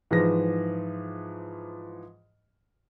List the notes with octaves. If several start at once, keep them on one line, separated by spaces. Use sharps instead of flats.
G#2 E3 F3 A#6